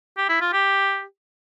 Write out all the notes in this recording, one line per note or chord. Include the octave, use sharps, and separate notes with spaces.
G4
E4
F4
G4